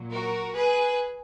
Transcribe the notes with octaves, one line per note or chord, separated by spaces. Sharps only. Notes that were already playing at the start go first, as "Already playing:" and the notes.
Already playing: A#2 F#3
F#4 A#4
G#4 B4